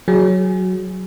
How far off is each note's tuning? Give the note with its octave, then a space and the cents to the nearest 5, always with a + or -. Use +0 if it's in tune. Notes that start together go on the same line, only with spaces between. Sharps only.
F#3 +0 G#4 +0